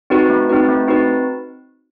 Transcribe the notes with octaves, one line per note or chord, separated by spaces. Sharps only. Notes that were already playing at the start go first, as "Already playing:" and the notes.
C4 D#4 F#4 B4
A3
C4 D#4 F#4 B4
A3
C4 D#4 F#4 B4